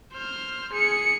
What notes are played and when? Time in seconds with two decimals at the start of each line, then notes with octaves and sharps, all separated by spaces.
0.13 C5 F6
0.73 G#4 C#7